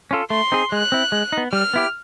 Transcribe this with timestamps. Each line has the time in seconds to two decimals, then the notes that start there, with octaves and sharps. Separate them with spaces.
0.11 C#4 F4 A4
0.30 A3 C6
0.52 C4 D#4 G#4
0.72 G#3 F#6
0.92 C4 E4
1.12 G#3
1.32 B3 D#4
1.52 G3 F6
1.74 B3 E4 G4